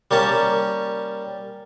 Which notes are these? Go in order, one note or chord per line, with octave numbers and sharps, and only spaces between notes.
G3 A#3 C#4 A5